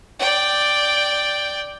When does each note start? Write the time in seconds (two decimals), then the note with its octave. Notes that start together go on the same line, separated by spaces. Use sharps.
0.19 D5 G5